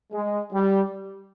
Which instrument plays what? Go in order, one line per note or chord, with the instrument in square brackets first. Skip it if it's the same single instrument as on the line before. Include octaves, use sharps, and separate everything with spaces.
[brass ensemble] G#3
G3